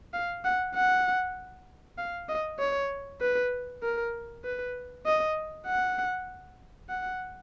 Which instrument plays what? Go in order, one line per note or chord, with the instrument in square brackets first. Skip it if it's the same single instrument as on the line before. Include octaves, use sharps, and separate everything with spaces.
[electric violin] F5
F#5
F#5
F5
D#5
C#5
B4
A#4
B4
D#5
F#5
F#5